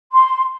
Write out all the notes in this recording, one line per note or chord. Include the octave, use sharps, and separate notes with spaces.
C6